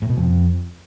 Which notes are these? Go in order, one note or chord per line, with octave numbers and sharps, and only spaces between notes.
A2
B2
F2